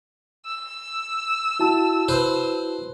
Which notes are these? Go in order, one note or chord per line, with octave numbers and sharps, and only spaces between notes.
E6
E4 F#4 A5
B4 C5